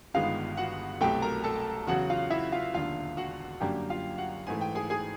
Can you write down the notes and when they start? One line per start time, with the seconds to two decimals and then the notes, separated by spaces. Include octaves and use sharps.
0.14 G1 G2 D#3 G#3 B3 F4 F5
0.57 F#4 F#5
1.01 C2 B2 F#3 A3 G4 G5
1.22 A#4 A#5
1.44 A4 A5
1.87 E2 C#3 F#3 F#4 F#5
2.10 F4 F5
2.30 E4 E5
2.52 F4 F5
2.74 E1 D#2 D3 F4 F5
3.17 F#4 F#5
3.60 F#2 D3 G3 A#3 D4 G4 G5
3.90 F4 F5
4.18 F#4 F#5
4.47 G#2 E3 A3 G#5
4.61 G5
4.75 G#4 G#5
4.90 G#4 G#5